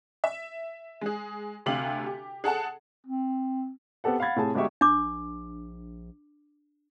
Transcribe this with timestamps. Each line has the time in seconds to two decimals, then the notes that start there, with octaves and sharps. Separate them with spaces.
0.24 E5
1.01 G#3 G#4
1.66 D2 C3 G4 F5 F#7
2.06 G4
2.44 G#4 A4 F#5 A5
3.06 C4
4.04 B3 C4 G4 A4 F#5
4.20 F5 F#5 B5 G#6 A6
4.36 A2 C3 G#4 A5
4.55 G1 G#3 F#4 G4 E5 C#6
4.81 A#1 D4 D6